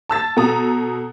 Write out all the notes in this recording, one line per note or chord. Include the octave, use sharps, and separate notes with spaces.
A5 E6 A6
B2 A4 A#5 D#6